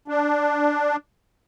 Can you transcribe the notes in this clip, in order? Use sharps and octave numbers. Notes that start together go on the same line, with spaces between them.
D4